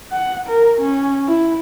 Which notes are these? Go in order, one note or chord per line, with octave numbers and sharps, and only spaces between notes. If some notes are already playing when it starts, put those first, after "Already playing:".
F#5
A#4
C#4
E4